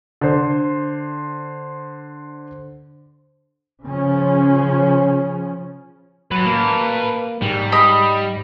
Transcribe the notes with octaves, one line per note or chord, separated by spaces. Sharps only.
D3 C5
C#3 F3 C#4
F#3 B4 A5
A#3
G#2 G3
D#5 B5